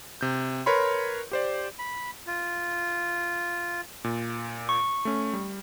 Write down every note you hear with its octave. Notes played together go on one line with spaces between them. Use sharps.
C3 G6
A#4 B4 C#5 B5 C6
G4 C5 D5
B5
F4
A#2
C#6
A3 C#4
G3